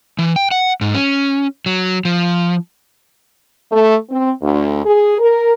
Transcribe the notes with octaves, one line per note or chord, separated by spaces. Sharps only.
E3
G5
F#5
G#2
C#4
F#3
F3
A3
C4
D2
G#4
A#4